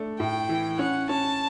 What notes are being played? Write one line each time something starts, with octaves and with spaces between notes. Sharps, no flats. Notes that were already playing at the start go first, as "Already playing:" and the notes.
Already playing: A3 D4
A2 G5
E3
C#4 F#5
C#4 A5